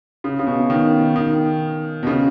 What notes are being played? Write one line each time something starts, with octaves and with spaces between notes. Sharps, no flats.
C#3
C#3
B2
D#3
D#3
B2
C#3